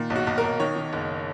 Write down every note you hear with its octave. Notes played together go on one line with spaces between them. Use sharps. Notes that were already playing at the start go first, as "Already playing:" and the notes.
Already playing: A#2 D#3
B1
F#4
B1
A#4
B1
D#3 C#5
D#3
F#1